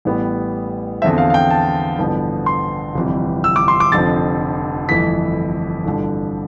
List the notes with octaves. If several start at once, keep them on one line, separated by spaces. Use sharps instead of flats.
A1 A2 G3 B3
E2 D3 F3 C4 E5
F5
F5
G5
A5
A1 G2 D3 F3 B3
C6
G1 F2 C3 E3 G3
E6
D6
C6
D6
F1 F2 D3 F3 C4 A6
G1 F2 E3 A3 E4 B6
A1 G2 D3 F3